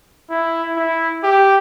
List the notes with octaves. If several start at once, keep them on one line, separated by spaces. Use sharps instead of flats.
E4
E4
G4